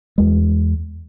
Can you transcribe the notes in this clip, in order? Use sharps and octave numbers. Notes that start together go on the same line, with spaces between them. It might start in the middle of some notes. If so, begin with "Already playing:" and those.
E2 G#3